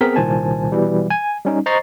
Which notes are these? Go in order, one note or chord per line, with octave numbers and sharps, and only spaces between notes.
B3 C4 G#4 A#4 B6
C2 A#2 D#3 C5 G#5 A5
B2 E3 G3
G#5
G3 C#4 D#4
C5 D#5 A#5 C#6 A6 C7